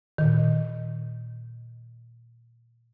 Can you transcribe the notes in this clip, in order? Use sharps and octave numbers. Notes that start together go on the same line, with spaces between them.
A#2 D#3